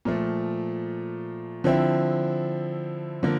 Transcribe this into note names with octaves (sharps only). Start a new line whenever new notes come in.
A#2 F3 A3
D3 F3 C4 E4
D3 F3 A#3